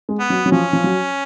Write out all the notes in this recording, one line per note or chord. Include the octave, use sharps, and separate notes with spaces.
G#3
B3
F#3
F#3
F3 C#4
F3
F#3